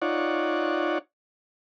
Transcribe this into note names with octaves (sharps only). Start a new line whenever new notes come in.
D#4 F4 C#5 D5 F#5